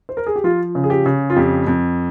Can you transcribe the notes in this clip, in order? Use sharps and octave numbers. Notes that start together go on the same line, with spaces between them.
C5
A#4
G#4
G4
F3 F4
C#3
G#4
G4
C#3
F4
F2 G4
F2